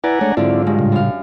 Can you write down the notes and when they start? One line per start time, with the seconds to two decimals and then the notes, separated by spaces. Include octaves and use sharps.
0.04 E4 B4 D5 F#5 G#5 A#5
0.21 G#3 A3 D4 C#5
0.37 G#2 D3 F#3 C4 E4 F4 D5
0.67 G2 G#3
0.79 A2 C#3 G3
0.92 F#2 F5